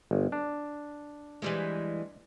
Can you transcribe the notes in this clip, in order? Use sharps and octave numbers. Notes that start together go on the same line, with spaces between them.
G1
D4
E3 G3 G#3